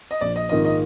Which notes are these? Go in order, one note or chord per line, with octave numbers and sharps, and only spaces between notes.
D#5
A#1 D5
D#5
G#2 D#3 A#3 F4 D#5
D#5